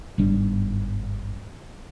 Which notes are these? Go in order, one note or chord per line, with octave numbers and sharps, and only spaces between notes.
G1 G#2 G3 D4